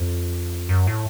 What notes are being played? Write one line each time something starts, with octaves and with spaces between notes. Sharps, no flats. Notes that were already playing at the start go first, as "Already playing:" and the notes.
Already playing: F2
F#2
A2